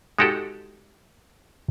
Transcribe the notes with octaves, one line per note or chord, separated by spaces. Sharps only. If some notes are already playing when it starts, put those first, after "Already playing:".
G#3 D#4 F#4 G4 A4